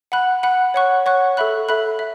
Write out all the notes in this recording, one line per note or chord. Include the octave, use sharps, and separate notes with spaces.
F#5 B5 F#6
F#5 B5 F#6
C#5 F#5 C#6 F#6
C#5 F#5 C#6 F#6
A4 E5 B5 F#6
A4 E5 B5 F#6
E5